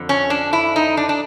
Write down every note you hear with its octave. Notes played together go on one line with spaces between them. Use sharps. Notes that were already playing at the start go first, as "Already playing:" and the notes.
Already playing: F2 D3
C#4
D4
E4
D#4
D4
D4